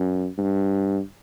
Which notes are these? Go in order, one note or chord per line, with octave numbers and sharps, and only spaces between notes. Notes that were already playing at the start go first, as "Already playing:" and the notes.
Already playing: F#2
G2